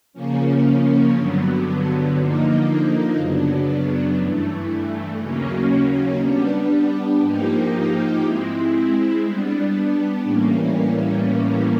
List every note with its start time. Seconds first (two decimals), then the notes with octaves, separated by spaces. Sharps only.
0.13 C#3 F3 A#3 C#4
1.14 G2 D3 F#3 B3
2.16 D3 F3 A#3 D#4
3.16 F#2 C#3 F#3 B3 D4
4.18 G2 E3 A3
5.18 D#2 C#3 F#3 A#3 C#4
6.20 G3 B3 D4
7.21 G#2 F3 A#3 D#4 G4
8.21 G#3 C4 E4
9.23 G3 B3 D4
10.24 A2 E3 G3 A#3 C#4